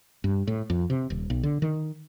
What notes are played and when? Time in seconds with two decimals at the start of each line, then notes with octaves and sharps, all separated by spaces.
0.24 G2
0.47 A2
0.70 F2
0.90 C3
1.10 D#1
1.30 B1
1.43 D3
1.62 D#3